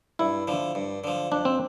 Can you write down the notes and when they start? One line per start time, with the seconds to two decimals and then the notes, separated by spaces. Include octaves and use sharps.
0.19 G2 E4
0.47 D3 F3
0.75 G2
1.04 D3 F3
1.32 F2 D4
1.45 C4